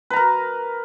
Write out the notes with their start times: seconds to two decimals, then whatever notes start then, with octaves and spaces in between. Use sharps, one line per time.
0.10 B4
0.13 A#5
0.16 A#4